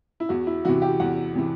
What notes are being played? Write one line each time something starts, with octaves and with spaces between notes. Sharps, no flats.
E4
E2 F#4
E4
C3 E3 F#4
G4
E2 F#5
C3 E3